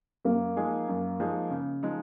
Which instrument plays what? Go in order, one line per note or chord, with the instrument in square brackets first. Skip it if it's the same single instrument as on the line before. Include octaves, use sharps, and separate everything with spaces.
[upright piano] F#2 [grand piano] A#3
[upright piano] F3 G#3 D#4 G#4
F#2
F3 G#3 D#4 G#4
C#3
F3 G#3 D#4